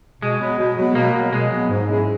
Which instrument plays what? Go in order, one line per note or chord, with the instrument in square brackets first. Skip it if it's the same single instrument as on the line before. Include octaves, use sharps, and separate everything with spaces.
[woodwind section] B2 [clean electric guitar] G#3
[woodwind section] F#3 B3
B2
F#3 B3
[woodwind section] B2 [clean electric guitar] A#3
[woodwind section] F#3 B3
[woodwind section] B2 [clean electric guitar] G#3
[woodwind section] F#3 B3
G#2
F#3 C#4 E4 G#4